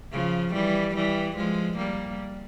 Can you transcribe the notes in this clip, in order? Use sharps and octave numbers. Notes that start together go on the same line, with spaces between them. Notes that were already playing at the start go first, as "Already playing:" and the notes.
C#3 F3
E3 G3
E3 G3
F3 G#3
G3 A#3